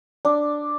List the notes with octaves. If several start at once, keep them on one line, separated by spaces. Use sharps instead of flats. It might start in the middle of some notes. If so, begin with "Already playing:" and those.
D4